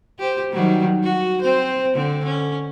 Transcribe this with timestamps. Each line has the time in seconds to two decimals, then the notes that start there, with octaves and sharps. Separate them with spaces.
0.19 G4 C5
0.52 D#3 F#3 G3
1.04 F#4
1.42 C4 C5
1.94 D3 C4
2.25 C#4